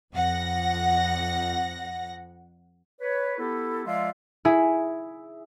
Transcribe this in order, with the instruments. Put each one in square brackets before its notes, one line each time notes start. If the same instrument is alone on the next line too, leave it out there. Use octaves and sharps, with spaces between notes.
[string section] F2 F#5 A#6
[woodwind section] B4 C#5
B3 E4 G4 A4
F3 G#3 F4 D5 E5 F5
[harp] E4 G#4